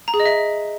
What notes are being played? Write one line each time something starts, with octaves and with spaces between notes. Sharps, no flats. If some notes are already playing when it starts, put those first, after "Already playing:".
A#5
G#4
D#5
E5